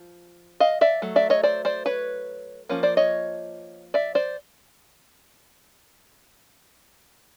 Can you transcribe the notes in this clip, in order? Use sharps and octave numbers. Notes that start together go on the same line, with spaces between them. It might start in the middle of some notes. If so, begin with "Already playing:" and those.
Already playing: F3
D#5 F5
D5 E5
F#3 A3
D5 E5
C#5 D#5
C5 D5
C5 D5
B4 C#5
F3 A#3 C#4
C5 D5
C#5 D#5
D5 E5
C5 D5